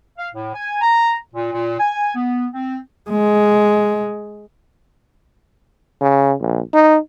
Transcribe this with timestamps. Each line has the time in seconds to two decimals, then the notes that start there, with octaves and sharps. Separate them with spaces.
0.18 F5
0.34 A2
0.54 G#5
0.82 A#5
1.34 A#2
1.53 A#2
1.80 G#5
2.15 B3
2.53 C4
3.10 G#3
6.01 C#3
6.40 A#1
6.74 D#4